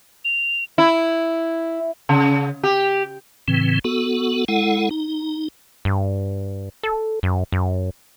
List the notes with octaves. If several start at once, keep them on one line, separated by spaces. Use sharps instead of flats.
F7
E4
C#3
G4
A2 C#3 E3 C4
B3 F#4 A4
G#3 E4 A4 F#5
D#4
G2
A4
F#2
F#2